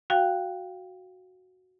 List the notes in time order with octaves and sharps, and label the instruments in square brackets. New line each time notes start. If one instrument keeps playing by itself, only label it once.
[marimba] F#4 F5 G5